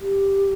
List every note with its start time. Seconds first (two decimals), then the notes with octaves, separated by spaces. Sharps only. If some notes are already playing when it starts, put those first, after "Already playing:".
0.01 G4